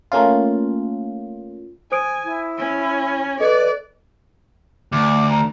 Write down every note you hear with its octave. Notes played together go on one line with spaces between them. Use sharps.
A3 A#3 C#4 F4
C5 G#5 D#6 D7
E4
C#4
A4 B4 D5 D#5
D2 D6
A#5